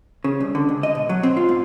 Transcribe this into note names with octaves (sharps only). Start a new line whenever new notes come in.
C#3
C2
D3
C#2
D#5
B2
F#3
C4
F4
G#2